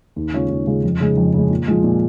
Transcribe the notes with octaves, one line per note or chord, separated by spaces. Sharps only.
D#2
C#3 G#3 C#4 F4
D#2
C#3 G#3 C#4 F4
F2
C#3 G#3
F2
C#3 G#3
A#2
F3 G#3
A#2